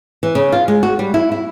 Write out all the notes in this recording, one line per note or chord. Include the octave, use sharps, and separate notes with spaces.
E3
C#3
F4
G#3
F#4
G3
E4
E4